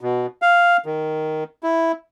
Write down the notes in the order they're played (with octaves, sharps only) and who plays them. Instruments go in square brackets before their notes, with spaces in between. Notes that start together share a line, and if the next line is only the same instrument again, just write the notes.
[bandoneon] B2
F5
D#3
E4